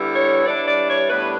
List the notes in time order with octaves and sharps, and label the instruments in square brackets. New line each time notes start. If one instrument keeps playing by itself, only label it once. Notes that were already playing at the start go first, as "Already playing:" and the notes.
Already playing: [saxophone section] D3 G3 B3 E4
C#5
E3 G3 D4 D5
D5
C#5
A2 G3 B3 D4 B4